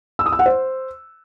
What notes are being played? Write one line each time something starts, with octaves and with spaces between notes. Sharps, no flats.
E6
D#6
E6
F#5
C5